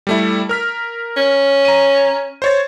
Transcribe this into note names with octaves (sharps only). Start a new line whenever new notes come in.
G3 A3 E4
A#4 F6 B6
C#4
A#5 D#7
C5 C#5 A6